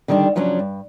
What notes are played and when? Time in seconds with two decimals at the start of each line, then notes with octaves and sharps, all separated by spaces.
0.08 D3 D#3 G3 C#4 D4
0.35 C#3 F3 F#3 B3 C#4 D4
0.59 G2